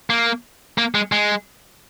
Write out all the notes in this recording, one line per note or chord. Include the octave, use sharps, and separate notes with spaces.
A#3
A#3
G#3
G#3